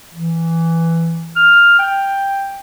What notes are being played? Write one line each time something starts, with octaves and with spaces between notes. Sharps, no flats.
E3
F6
G5